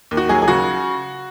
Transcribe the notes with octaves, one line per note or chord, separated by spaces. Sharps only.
D#2
F#4
F#3 G#4
G#4
C#3 F#4